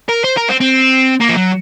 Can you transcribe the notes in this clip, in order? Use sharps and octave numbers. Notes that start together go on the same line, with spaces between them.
A#4
C5
A#4
C4
C4
A#3
F3
F#3